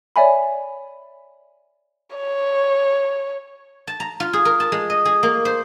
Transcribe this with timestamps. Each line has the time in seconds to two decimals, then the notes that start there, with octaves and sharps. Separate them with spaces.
0.16 C#5 D5 E5 G#5 B5
2.16 C#5
3.87 A5
4.00 A#5
4.20 F4
4.33 G#4
4.45 A#4
4.60 A5
4.72 G#3
4.90 D#5
5.05 G#4
5.23 A#3
5.45 C5